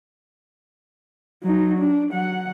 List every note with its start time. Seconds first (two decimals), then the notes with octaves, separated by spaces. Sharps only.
1.43 F#3 D#4
1.78 D4
2.09 F#3 F#5